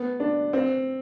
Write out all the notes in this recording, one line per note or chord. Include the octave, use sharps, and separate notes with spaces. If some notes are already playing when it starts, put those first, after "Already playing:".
Already playing: B3
D4
C4